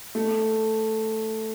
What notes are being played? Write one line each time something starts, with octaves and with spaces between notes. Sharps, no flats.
A3